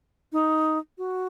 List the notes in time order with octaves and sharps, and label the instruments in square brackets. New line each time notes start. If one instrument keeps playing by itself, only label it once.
[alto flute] D#4
F#4